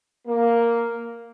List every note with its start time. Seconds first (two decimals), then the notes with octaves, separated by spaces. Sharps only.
0.27 A#3